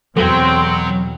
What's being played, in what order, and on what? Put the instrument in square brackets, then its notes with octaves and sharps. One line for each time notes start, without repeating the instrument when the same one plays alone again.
[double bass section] E2 B2 [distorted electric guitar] F#3 [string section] C4 [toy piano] A4